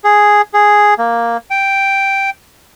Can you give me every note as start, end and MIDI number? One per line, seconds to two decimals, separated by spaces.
0.04 0.42 68
0.54 0.94 68
0.98 1.37 58
1.50 2.30 79